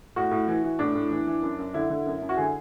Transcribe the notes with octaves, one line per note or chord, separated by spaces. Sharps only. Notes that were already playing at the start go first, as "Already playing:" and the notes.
A2 F#4
A2
E3
E3
A2 D4
A2
E3
E3
F#2
F#2
D3 E4
D3
F#2
F#2
F#4
D3 G#4